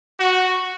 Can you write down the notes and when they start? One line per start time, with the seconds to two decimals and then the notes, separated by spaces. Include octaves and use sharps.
0.19 F#4